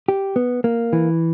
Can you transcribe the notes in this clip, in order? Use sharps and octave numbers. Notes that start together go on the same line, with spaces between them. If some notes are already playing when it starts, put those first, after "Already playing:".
G4
B3
A#3
E3